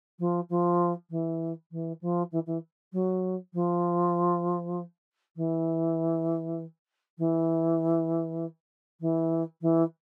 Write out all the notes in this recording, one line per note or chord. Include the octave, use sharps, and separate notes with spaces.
F3
F3
E3
E3
F3
E3
E3
F#3
F3
E3
E3
E3
E3